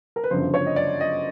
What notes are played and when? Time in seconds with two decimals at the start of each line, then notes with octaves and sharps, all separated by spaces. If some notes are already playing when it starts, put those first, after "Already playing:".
0.16 A#4
0.24 B4
0.31 G1 F#2 C#3 F3 C5
0.54 C#5
0.66 D#5
0.76 D5
1.00 D#5